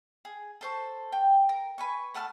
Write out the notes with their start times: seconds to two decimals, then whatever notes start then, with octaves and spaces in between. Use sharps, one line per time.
0.25 G#4
0.61 A4 C5 C#6
1.12 G5
1.49 A#4
1.78 B4 G#5 C#6
2.14 A3 F#5 A5 F6